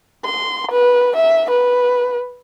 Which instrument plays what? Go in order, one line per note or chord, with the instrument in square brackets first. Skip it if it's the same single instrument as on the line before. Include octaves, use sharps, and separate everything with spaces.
[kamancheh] C6
B4
E5
B4